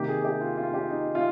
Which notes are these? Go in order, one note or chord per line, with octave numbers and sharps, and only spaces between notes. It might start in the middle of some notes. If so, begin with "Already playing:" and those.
Already playing: C3 D#3 A#3 G4
G#4
G4
F4
F4
G4
D#4
F4